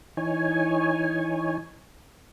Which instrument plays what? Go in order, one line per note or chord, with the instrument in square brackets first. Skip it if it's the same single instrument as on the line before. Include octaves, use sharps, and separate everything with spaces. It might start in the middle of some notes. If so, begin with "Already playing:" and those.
[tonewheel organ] E3 D#4 C#5 G#5